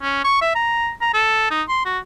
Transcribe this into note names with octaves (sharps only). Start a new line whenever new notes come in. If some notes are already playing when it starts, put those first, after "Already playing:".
C#4
C#6
E5
A#5
A#5
A4
D#4
C6
F#4